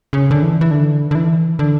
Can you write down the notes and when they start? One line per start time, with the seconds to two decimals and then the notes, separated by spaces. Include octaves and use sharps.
0.13 C#3
0.31 D3
0.42 E3
0.61 E3
0.71 D3
1.11 D3
1.15 E3
1.59 D3